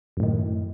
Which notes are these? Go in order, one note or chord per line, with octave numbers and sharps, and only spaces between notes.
F#2 A2 D#3